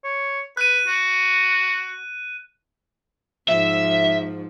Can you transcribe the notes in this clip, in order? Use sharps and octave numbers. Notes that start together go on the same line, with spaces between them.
C#5
B4 F#6 D#7
F#4
G#2 F3 E5